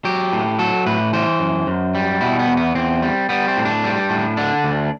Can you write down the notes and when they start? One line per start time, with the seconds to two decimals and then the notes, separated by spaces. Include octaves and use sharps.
0.05 F#3 G4
0.33 A2
0.59 F#3 A4
0.86 A2 B4
1.13 E3 C5
1.40 F#2
1.67 F#2
1.95 G3
2.21 B2 E4
2.39 B3
2.48 E2
2.57 B3
2.75 E2 C4
3.03 G3
3.29 G3 B3
3.48 C4
3.57 A2
3.65 D4
3.84 G3
4.10 A2
4.37 D3 D4
4.64 D2